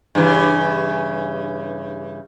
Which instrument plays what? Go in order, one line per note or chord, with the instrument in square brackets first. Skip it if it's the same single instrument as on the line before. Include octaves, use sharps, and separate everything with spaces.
[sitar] G2 C#3 E3